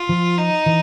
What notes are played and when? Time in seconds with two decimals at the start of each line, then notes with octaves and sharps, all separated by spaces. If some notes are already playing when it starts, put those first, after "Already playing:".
Already playing: F4
0.09 F3
0.38 D#4
0.66 E3